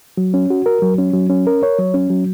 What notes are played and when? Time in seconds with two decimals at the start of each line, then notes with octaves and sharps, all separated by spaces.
0.17 F#3
0.34 C#4
0.50 F#4
0.66 A#4
0.82 F#3
0.98 C#4
1.13 F#3
1.30 C#4
1.47 A#4
1.63 C#5
1.79 F#3
1.94 C#4
2.10 F#3